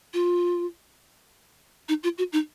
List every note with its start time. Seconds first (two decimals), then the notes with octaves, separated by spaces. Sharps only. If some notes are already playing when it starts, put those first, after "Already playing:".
0.13 F4
1.88 D#4
2.03 F4
2.18 F#4
2.32 D#4